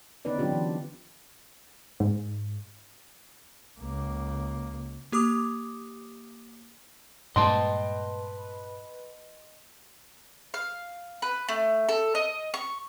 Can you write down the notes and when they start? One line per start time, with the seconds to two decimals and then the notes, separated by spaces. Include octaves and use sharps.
0.25 D3 B3 C#4 D#4 B4 D5
0.39 F#3 C4 D4 F4 G4
0.52 E3
2.00 G#2
3.80 C#2 A#3
5.12 A#3 G4 D6 D#6
7.36 G2 A#2 G#3 B4 D#5 G5 A5 C6
10.54 F5
11.22 B4
11.48 A3
11.89 A4
12.15 D#5
12.54 C#6